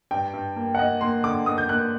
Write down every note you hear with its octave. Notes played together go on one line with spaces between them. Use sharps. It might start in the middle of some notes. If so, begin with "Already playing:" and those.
G2 G5
G2
A#3
F#5
A#3 D#5
A#3 C6
D3 D6
A#3 D#6
G6
A#3 F#6